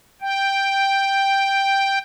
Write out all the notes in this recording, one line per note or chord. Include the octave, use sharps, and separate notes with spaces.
G5